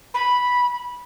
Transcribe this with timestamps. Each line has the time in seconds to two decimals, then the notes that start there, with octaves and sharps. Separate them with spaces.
0.14 B5